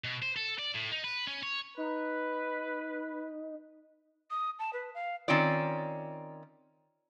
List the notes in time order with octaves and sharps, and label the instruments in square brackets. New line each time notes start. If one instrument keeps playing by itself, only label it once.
[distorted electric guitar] B2
C5
A4
D5
A2
D#4
B4
C#4
C#5
[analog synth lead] D#4 [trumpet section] B4
[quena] D#6
A5
B4
F5
[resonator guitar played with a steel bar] D#3 C4 C#4 F4 D5